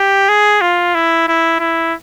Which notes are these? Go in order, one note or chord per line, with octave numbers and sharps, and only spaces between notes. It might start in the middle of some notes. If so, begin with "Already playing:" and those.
Already playing: G4
G#4
F4
E4
E4
E4